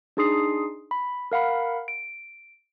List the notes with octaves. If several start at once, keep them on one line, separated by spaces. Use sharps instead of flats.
D4 D#4 G#4 C6 D#6 C7
B5
A#4 F5 F#5 B5
D7